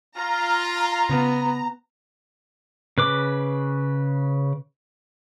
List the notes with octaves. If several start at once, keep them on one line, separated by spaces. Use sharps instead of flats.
F4 A#5
C#3 B3
C#3 B4 D6